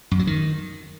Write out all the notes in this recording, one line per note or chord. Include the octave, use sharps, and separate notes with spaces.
F#2
F#3
D#3